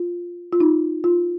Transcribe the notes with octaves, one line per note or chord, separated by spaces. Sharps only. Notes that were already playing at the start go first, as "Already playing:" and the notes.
Already playing: F4
F4
D#4
F4